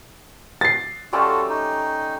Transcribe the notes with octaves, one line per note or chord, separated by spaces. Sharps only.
A6 C7
G3 A3 C#4 F4 F#4 A4
D#4